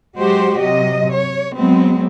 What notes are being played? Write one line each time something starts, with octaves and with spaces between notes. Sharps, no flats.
F#3 G#3 F#4 G4 C5
C3 F#3 D#5
C#5
F#3 G#3 B3 C4